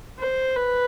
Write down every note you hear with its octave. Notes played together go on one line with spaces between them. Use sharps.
C5
B4